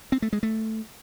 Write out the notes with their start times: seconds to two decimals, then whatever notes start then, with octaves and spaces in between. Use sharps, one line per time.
0.12 C4
0.22 A3
0.33 G#3
0.43 A3